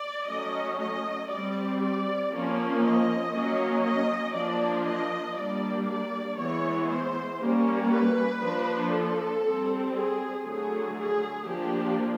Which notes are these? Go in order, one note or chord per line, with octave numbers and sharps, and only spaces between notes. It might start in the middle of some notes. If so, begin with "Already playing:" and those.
Already playing: D5
F#3 A3 C#4 D#5
D#5
G3 C4 D5
D5
F3 A#3 C#4
D#5
F#3 A#3 C#4
D#5
F3 A#3 D4 D5
D#5
G3 A#3 D4 D5
D5
E3 G#3 B3 C#5
C5
G3 A#3 C#4
B4
F3 A#3 D4
A4
G3 C4
G#4
D3 F#3 A3 G#4
G#4
F3 A#3 D4 G4